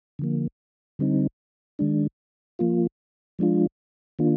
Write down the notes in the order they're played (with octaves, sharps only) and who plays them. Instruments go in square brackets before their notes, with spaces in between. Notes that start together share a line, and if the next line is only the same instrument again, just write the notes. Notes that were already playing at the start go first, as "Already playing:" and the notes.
[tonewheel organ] D3 F3 A#3
D3 G3 C4 D#4
D#3 G#3 D4
F3 A#3 F4
F3 G#3 D4 F4
D#3 A#3 D4 F4